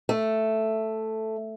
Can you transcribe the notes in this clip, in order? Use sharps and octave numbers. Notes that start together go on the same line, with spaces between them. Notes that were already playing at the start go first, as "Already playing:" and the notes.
A3